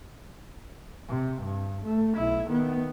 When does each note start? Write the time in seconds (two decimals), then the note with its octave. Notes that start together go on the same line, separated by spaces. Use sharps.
1.08 C3
1.42 G2
1.84 A3
2.16 B1 E4
2.48 D#3 B3